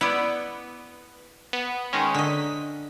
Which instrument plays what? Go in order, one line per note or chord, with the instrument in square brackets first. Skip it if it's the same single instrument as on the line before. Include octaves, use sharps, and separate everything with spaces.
[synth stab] B3 [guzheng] E4 D5
[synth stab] B3
D#3 G#3 C#4
[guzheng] D3 D#5 [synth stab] B6